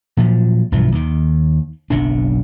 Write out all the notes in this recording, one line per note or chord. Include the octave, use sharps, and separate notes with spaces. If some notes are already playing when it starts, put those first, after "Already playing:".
A#2 F3 F#3
B1 G2 E3 F3
D#2 D#3
F#1 B1 D3 D4